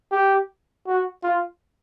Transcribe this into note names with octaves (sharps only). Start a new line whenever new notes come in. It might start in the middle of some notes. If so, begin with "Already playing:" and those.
G4
F#4
F4